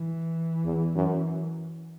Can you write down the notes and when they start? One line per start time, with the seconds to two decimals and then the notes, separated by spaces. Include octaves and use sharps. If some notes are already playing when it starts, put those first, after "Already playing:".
Already playing: E3
0.65 E2
0.95 F#2